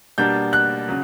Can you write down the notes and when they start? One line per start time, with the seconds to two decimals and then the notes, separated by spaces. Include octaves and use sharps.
0.18 B2 G3 A#3 D4 G6
0.53 F#6
0.88 C#3 F#3